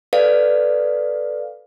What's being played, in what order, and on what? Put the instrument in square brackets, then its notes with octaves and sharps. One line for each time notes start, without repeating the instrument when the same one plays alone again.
[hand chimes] A4 B4 D5 F5